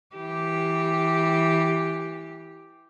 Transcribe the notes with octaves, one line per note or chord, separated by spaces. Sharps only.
E3 G4